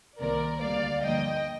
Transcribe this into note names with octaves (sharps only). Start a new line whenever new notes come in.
C2 C3 D#3 A#3 A#4 D5
D2 C3 G3 A#3 D5 F5
G2 D3 F3 A#3 D#5 G5